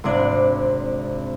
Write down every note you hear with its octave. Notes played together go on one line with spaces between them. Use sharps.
G#1 C3 D4 D5